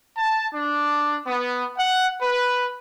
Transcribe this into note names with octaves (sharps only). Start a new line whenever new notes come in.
A5
D4
B3
F#5
B4